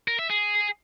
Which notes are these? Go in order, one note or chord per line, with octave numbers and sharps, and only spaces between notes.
A#4
E5
G#4